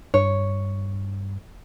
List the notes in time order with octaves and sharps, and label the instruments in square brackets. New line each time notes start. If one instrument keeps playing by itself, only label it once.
[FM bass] G2 [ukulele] C#5